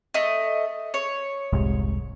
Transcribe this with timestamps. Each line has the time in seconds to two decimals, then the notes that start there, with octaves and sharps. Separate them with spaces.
0.14 A3 D#5
0.94 C#5
1.53 F1 C2 G#2